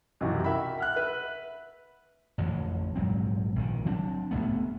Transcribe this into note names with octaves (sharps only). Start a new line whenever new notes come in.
B1 F#2 C3 E3 F#4
A#4 E5 F#5 G5 B5
F#5 F6 F#6
B4 E5
A1 F2 D3 E3
A#1 G#2 F#3 C4
A#1 D#3
F#3 C4 D4
G1 G2 A3 B3